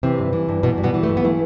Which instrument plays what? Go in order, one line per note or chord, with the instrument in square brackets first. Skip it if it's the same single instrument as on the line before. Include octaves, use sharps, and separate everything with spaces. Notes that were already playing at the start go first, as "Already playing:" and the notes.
[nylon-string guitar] C3 E3 C4
G2
E3
G2
B2 E3 B3
G2
B2 B3
E3
A3
G2
B3
E3 A3